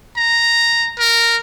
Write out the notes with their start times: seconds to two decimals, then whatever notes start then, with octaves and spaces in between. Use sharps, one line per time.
0.17 A#5
0.99 A#4